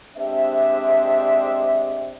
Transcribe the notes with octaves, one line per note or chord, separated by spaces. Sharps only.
G#3 C4 D4 G4 C5 E5